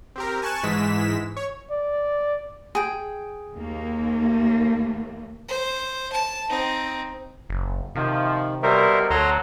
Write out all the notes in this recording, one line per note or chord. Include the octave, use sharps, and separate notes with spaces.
C4 G4 A#4
G#5 A5 C#6 F#6 E7
G#2 E3 G#3 B6 E7
C#5
D5
G#4 G5
D#2 A#3
C5
A5
C4 D#4
F#1
C3 D#3 F3
B2 G3 A#4 C5 E5
D2 F#3 A4 A#5 C6